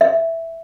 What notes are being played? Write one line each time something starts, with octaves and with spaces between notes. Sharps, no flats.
E5